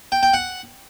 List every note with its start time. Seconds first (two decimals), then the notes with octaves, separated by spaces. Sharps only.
0.12 G5
0.23 G5
0.34 F#5